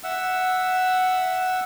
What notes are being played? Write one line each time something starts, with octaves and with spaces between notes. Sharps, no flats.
E5 F#5 E6